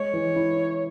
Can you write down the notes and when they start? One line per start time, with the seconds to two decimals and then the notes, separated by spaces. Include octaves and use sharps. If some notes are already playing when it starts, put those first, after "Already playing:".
Already playing: G#3 C#5
0.14 E3
0.36 E4